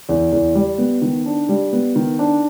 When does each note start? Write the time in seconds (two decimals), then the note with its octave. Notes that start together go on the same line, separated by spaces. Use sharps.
0.09 E2
0.32 E2
0.55 G3
0.78 B3
1.02 D#3
1.26 D4
1.49 G3
1.73 B3
1.96 D#3
2.19 D4